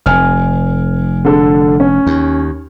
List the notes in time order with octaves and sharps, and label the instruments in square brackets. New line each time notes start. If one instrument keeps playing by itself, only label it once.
[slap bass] F1 [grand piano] G#5 F6
[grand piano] D3 A4
C#4
[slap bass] D#2